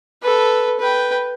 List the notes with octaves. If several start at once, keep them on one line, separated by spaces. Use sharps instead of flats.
A4 B4
B4 G5